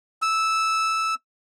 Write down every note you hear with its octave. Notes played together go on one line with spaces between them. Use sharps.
E6